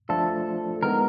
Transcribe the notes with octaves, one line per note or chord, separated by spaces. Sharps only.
F3 A3 D4 F4 A4
D#3 G#3 B3 A#4